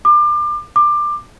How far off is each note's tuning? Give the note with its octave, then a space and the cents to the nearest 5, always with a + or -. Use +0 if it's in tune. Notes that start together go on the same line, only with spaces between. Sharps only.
D6 +30
D6 +20